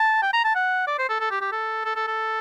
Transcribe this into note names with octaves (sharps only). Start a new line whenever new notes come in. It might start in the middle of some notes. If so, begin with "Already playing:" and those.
Already playing: A5
G5
A#5
A5
F#5
D5
C5
A4
A4
G4
G4
A4
A4
A4
A4